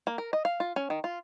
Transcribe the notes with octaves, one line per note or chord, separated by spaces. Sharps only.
A#3
A#4
D#5
F5
F4
C#4
D#3
F4